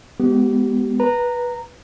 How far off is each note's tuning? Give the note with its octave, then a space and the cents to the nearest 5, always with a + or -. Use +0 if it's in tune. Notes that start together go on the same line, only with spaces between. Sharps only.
G#3 +0 B3 +0 G4 -30
B4 -15 A#5 -10